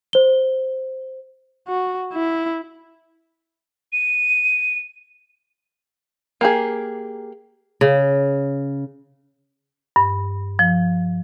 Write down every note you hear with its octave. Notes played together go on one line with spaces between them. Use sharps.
C5 G7
F#4
E4
D#7
A#3 G4 G#4
C#3
G2
F3